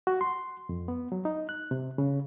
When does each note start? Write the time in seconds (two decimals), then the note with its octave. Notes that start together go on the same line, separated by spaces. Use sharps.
0.07 F#4
0.21 C6
0.69 F2
0.88 B3
1.12 F#3
1.25 D#4
1.49 F#6
1.71 C3
1.98 C#3